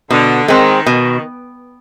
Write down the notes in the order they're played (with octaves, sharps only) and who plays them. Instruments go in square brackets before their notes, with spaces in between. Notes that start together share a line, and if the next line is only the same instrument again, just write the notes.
[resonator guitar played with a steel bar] B2 [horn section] D3
[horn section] D#3 [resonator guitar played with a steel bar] G#3 C4
[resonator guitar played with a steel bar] B2 [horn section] D#3